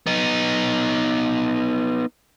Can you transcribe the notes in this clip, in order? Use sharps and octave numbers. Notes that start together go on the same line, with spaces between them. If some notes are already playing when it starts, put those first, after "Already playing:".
B3 D#4